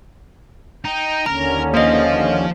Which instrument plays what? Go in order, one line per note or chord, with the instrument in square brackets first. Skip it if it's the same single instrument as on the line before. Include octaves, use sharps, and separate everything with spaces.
[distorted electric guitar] D#4 [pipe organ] G5
[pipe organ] D#2 D3 C#4 [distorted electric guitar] A#4 [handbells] A#5
[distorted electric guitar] F3 [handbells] A#3 D#5